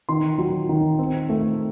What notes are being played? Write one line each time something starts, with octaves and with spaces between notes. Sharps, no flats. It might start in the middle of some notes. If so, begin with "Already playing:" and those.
D#3 C6
F#3
D#3
C4
A3